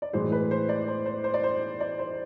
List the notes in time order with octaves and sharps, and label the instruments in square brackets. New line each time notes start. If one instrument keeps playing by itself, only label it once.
[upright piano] D5
A2 E3 G#3 C5
B4
C5
D5
C5
C5
C5
D5
C5
D5
C5